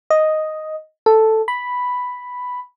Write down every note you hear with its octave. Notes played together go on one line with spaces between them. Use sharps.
D#5
A4
B5